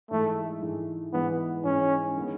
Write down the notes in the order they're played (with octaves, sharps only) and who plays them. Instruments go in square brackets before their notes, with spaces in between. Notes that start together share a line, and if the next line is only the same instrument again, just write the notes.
[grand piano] G#2 E3 G#3 [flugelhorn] A3
[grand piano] G#2 E3 G#3
[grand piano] G#2 E3 G#3 [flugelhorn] B3
[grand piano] G#2 E3 G#3 [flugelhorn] C#4
[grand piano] D#3 G#3 B3